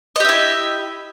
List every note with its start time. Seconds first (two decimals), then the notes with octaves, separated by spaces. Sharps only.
0.16 D#5
0.20 G4
0.24 E5
0.29 E4